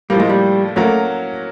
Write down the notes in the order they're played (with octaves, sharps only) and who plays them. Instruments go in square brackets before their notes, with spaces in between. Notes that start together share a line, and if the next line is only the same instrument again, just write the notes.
[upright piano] A2 F3 A#3 [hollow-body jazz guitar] G3
[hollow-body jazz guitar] G#3
G3
[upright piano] F#3 A#3 C#4 F#4 A#4 [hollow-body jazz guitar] A3